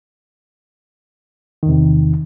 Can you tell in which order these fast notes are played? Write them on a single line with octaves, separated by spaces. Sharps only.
D#3 E2 C3